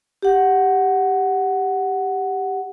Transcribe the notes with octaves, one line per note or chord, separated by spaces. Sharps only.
G4 F#5